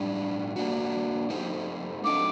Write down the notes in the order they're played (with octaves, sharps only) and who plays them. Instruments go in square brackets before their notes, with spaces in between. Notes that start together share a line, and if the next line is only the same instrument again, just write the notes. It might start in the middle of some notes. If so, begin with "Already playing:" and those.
Already playing: [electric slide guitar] A2 G3 D4
A#3 D4 F#4
A3 D#4 G4 C5
[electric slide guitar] A3 D4 A4 D#5 [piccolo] D6